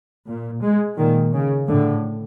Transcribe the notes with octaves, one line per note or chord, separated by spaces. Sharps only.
A#2
G#3
A#2 D#3
C#3
A2 D3